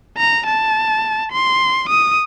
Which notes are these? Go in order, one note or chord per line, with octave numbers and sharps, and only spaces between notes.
A#5
A5
C6
D#6